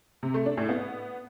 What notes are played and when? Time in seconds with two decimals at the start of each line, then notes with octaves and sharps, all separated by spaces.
0.23 C3
0.34 A3
0.46 D4
0.57 A2
0.69 B3